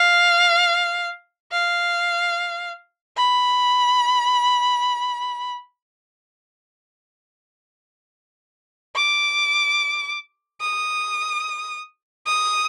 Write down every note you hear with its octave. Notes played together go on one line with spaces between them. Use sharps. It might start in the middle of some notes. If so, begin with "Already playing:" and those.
Already playing: F5
F5
B5
D6
D#6
D#6